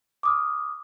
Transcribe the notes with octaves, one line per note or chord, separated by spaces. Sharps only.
D6 D#6 F6